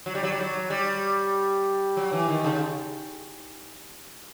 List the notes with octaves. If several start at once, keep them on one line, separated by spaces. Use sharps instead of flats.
F#3
G3
F#3
G3
F#3
G3
F#3
E3
D#3
C#3